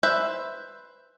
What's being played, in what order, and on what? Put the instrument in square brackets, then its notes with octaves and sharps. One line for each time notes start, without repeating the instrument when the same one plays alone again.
[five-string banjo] B4 C5 E5